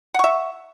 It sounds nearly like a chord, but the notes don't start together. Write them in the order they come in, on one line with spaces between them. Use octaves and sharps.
F#5 C#6 E5